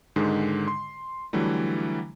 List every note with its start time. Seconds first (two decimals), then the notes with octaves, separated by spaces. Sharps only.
0.16 G#2 D3 D#3 G#3
0.68 C6
1.33 D3 E3 F#3 G3 A3